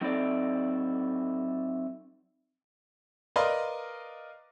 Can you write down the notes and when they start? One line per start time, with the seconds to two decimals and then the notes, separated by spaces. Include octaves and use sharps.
0.01 F#3 C4 D#4 E4 A4 D5
3.36 A#4 B4 D5 D#5 F5 C6